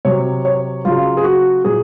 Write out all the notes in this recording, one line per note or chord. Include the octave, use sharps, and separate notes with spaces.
C3 F#3 C#5
C#5
C#3 F#3 F4
G#4
F#4
A#2 F#3 G#4